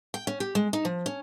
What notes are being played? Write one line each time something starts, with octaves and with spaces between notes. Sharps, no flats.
G5
C#4
G4
G#3
D#4
F3
C#4